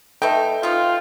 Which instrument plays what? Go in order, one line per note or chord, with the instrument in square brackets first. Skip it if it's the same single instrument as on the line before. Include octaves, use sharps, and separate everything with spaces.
[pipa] A3 D#4 [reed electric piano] A4 B4 E5 [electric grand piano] G5
[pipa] F3 D#4 [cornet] F4